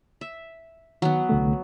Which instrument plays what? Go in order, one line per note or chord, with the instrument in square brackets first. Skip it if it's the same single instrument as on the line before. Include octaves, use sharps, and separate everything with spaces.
[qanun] E5
[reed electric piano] D#3 [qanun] F#3 B3
[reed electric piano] C2 D3 A3